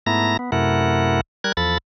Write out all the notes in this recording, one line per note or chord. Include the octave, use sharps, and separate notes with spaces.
G#2 A3 B3 E4 A#5 A#6
B3
F#2 C3 A3 E4 A#4 F#5
G3 A#4 F#6 G#6
E2 F3 A4 B5 A6